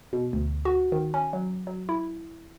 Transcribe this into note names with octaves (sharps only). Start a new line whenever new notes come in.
B2
D2
F#4
D#3
C#4
F#3
F#3
E4